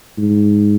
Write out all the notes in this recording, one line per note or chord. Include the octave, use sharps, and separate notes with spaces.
G#2